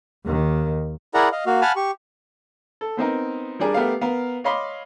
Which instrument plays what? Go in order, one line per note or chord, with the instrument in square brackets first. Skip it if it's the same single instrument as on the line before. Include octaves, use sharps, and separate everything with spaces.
[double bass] D#2 D#3
[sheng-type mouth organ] E4 G#4 A#4 D5 F#5 A#5
D#5 F5
A#3 F#4 F5
F5 F#5 G#5 A5 B5 F6
G4 C#6
[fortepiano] A4
B3 C4 D#4 A#4
G3 D4 G#4 A#4
A3 B3 G4 A#4 F5
B3 A#4 F5
C#5 D#5 F5 B5 C6 D6